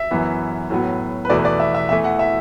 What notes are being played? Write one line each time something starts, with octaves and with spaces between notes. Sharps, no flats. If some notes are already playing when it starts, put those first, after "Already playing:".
Already playing: E5
F#2 E3 B3
A2 F#3 B3
B4
E2 B2 A3 D5
B4
D5
E5
E5
E2 E3 A3 E5
F#5
E5